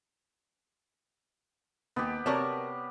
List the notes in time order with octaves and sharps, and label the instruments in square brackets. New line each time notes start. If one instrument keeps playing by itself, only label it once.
[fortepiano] D#2 [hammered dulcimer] B3 G4
[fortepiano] C3 [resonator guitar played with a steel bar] F#4 A#4 A5 [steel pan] C#5 D5